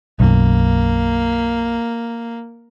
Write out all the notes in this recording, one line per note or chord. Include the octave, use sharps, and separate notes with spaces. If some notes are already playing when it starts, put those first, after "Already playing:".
B1 F#2 A#3